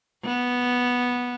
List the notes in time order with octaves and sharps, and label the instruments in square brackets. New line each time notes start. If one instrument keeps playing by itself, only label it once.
[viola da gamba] B3